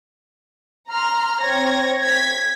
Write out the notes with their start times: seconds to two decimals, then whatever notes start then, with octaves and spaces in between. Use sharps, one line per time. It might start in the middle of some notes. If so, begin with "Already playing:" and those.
0.90 A#5 C6 F6
1.41 C4 C#5 G#6 A#6
2.01 G#6 B6